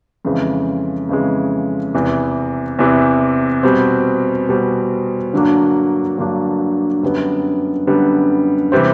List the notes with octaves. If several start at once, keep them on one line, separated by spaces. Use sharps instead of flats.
F2 C#3 E3 G#3
F2 C#3 E3 G#3
E2 C3 E3
E2 C3 E3
B2 G3 C4
B2 G3 C4
G2 D3 F#3 A#3 D4
G2 D3 F#3 A#3 D4
F#2 D3 G3 B3
F#2 D3 G3 B3
C3 E3 G3 C4